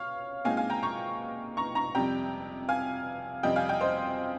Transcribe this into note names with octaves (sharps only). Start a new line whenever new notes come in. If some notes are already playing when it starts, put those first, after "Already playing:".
Already playing: C#5 F5
A#2 G#3 C4 D#4 F5 G#5
F5 G#5
G5 A#5
A#5 C#6
A#5 C#6
A#5 C#6
F2 C3 G3 G5 A#5
F5 G#5
F2 C3 G3 C4 D#5 G5
F5 G#5
D#5 G5
C5 D#5